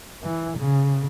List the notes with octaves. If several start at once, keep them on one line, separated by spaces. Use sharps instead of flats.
E3
C#3